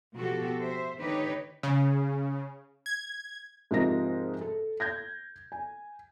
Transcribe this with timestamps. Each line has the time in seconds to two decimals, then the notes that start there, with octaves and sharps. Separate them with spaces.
0.17 B2 F3 F#4 G4 A4
0.61 C5 E5
0.99 D3 D#3 D#4 G4 B4 C#5
1.63 C#3
2.86 G#6
3.71 G#2 C3 F3 A#4 D#5 A#6
4.41 A4
4.80 G6 G#6 A#6
5.52 G#5